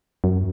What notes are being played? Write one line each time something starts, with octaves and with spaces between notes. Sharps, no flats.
F#2